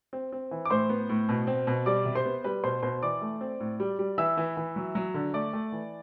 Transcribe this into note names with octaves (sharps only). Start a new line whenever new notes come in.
C4
C4
E3
D6
A2 C5 C6
B3
A2
B2
C4
B2
G3 D5 D6
C3
C5 C6
B3
G3 B4 B5
B2 C5 C6
B2 C5 C6
E3 D5 D6
A3
C4
A2
G3
G3
E3 E5 E6
E3
E3
F#3
F#3
D3
A3 D5 D6
A3
E3